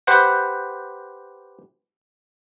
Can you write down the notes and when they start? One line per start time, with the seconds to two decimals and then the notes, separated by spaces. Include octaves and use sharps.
0.07 G4 B4 C5 F#5